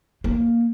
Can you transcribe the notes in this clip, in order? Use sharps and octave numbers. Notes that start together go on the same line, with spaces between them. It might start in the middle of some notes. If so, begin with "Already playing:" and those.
A#3